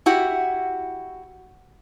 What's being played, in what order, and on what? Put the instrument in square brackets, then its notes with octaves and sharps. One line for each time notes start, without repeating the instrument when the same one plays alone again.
[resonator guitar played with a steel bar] E4 F#4 G4